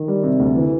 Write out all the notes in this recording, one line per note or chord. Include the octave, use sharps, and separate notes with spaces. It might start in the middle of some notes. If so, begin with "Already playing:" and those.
Already playing: D#3
G3
C3
D2
E3